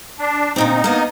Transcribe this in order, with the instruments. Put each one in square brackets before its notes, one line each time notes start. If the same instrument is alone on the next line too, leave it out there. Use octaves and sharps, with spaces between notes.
[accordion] D4
[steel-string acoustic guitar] D2 A#2 C4 [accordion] D#4
[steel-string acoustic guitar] A#3 B3 D#5